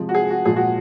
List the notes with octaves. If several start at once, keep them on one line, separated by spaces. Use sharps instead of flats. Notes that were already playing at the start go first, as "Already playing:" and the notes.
Already playing: C3 F3 G#3
F#4
G#4
F#4
A#2 F3 G#3 G#4
F#4